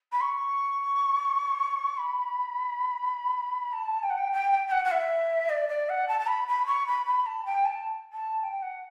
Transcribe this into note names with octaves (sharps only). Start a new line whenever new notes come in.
B5
C#6
B5
A5
G5
F#5
G5
G5
G5
G5
F#5
F#5
E5
D5
D5
F#5
A5
A5
B5
B5
C#6
B5
B5
A5
G5
A5
A5
G5
F#5